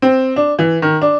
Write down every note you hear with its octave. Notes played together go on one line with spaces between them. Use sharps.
C4
D4
E3
D#3
D4